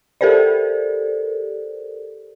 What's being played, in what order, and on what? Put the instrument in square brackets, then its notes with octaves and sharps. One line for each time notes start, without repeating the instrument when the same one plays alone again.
[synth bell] G4 A4 A#4 C5 D5